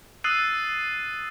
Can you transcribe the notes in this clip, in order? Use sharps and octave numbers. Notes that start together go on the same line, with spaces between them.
D#6 E6 F#6 A6 C7 D#7